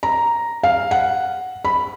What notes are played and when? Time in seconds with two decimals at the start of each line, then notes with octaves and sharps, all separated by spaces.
0.03 A#5
0.63 F5
0.91 F#5
1.65 B5